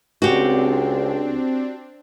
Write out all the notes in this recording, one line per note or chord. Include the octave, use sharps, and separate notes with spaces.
C#2 C4 D4 F#4 G4